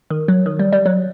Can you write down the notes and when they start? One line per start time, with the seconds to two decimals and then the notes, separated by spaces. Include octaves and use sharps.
0.10 D#3
0.28 F#3
0.46 D#3
0.59 G3
0.73 G3
0.86 F#3